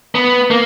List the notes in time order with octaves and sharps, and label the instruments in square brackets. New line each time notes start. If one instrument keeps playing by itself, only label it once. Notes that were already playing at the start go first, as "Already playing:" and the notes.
[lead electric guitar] B3
A#3